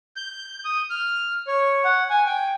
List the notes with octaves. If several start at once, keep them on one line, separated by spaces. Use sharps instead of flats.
G6
D#6
F6
C#5
F#5
G#5
G5